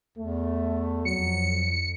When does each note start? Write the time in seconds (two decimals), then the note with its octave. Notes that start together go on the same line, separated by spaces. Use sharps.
0.18 E2 A3
1.05 F2 F#3 C#7